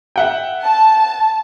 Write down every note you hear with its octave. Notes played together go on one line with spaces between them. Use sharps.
E5 F#5 G5
A5